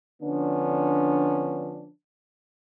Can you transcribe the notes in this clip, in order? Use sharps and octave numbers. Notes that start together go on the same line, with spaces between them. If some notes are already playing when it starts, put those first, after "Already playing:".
D3 F3 B3 C#4 D4